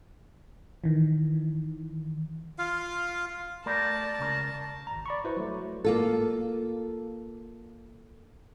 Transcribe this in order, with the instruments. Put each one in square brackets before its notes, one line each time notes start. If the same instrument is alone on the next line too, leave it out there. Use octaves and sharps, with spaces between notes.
[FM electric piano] D#3 E3
[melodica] F4 F5
[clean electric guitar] A3 G4 A#4 [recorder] D5 [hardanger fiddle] A5
[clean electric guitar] C#2 C#3 A#4
[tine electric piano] G#1 A#5
D5 B5 C#6
E4 F#4 B4 C5
F#3 A3
[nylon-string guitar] A#3 F4 A4